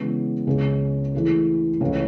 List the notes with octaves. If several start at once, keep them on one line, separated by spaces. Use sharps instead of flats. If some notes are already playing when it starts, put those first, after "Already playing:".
Already playing: C#3 E3 G#3 B3
C#2 C#3 G#3 C#4 G#4
E3 A3 E4 G#4
C#2 C#3 E3 A3 C#4